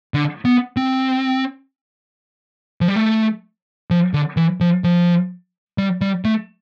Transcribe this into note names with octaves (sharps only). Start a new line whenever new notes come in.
D3
B3
C4
F3
G3
A3
F3
D3
E3
F3
F3
G3
G3
A3